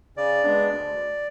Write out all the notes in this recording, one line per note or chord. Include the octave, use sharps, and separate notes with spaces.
C#3 D5
G#3 B3 D4
D2